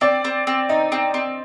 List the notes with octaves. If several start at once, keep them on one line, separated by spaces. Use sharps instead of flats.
C4 D5
C4
C4
D#4 D#5
C4
C4